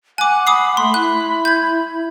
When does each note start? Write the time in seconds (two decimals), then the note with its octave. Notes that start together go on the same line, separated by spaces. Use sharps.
0.18 F#5 G#5 D6 F#6
0.47 B5 D6 D#6 C7
0.77 A3 C6
0.94 E4 F#6
1.45 G6 G#6